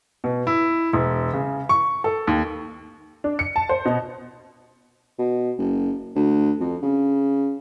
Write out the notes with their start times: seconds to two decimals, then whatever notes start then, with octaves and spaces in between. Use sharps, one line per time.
0.24 B2
0.47 E4
0.93 E1
1.34 C#3
1.69 C#6
2.04 A4
2.27 D#2
3.24 D4
3.39 C#7
3.56 A5
3.69 C5
3.85 B2
5.18 B2
5.58 F#1
6.16 D2
6.60 F2
6.83 C#3